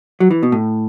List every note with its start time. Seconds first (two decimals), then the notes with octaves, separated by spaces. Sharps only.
0.20 F#3
0.31 E3
0.43 B2
0.52 A2